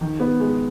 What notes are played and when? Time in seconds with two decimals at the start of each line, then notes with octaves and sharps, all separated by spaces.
0.01 D#3
0.20 B3
0.40 G#3